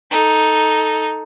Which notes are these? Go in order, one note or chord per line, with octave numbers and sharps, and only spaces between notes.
D#4 A4